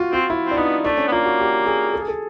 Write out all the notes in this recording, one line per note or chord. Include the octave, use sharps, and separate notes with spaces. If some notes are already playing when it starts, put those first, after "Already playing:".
Already playing: F4 F#4
C4 F4
E4
C4
D4
B3 D#4
A3 D4
C#4
B3
A#3 F4
F#4
G4
G#4
A4
G#4
A4